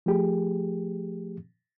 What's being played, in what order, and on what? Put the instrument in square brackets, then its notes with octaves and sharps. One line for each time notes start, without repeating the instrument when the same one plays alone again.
[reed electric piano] F3 A3 G4 G#4